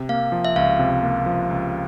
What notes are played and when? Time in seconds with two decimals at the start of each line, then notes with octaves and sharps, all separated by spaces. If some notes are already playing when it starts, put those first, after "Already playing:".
Already playing: C3
0.09 A#3 F5
0.32 F3
0.45 E5
0.56 C#2 F5
0.79 C3
1.03 A#3
1.26 F3
1.50 C#2